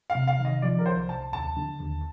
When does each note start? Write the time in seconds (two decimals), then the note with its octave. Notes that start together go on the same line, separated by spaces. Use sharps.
0.10 F5
0.15 C3
0.28 F5
0.39 D#3
0.45 D#5
0.62 F3 D5
0.79 A#4
0.86 C2 C5
1.09 C2 A5
1.32 D#2 A5
1.57 D3
1.80 D#2